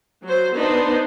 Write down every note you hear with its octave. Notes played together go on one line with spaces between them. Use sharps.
F#3 C5
B3 D4 D#4 B4 C5